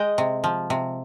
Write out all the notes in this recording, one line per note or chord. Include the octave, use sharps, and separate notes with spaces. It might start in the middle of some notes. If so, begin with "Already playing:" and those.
Already playing: G#3 D#5 G5
C3
F3
C3